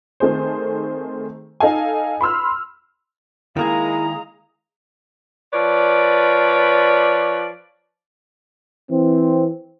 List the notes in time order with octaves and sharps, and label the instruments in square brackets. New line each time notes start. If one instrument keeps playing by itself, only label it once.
[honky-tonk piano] D#3 A3 C4 G#4 C5
D#4 A4 D#5 F5 G#5
B5 C6 E6 F6
[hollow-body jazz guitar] D#3 A#3 G#4 [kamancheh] G#3 F5 [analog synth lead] E4 [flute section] A#5 D#6
[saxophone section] F3 B4 C#5 D5
[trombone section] E3 C4